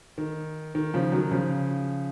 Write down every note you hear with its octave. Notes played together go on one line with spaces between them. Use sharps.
D#3
D#3
C#3 F3
D#3 F#3
C#3 F3